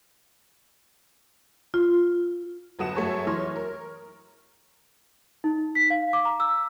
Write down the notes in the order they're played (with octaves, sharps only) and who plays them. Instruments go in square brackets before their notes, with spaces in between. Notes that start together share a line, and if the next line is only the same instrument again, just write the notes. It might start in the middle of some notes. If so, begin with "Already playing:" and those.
[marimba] F4
[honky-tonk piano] G1 F#3 A4 F#5 D#6 E7
F#2 A3 G#4 C#5 A5
F#2 E3 C#5 C6 F6 A#6
A#4
[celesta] D#4
B6
F5
D6
A#5
E6